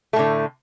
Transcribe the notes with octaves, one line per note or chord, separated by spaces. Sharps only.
A2 D3 A3